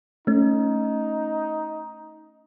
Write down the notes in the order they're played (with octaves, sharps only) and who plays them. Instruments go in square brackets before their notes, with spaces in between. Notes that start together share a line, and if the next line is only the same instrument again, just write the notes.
[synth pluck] A3 C#4 [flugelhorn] D#4